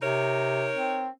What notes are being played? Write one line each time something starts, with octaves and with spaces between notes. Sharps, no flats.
C3 D#4 A#4 C#5
C4